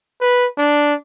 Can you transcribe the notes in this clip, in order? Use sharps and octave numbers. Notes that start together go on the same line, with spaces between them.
B4
D4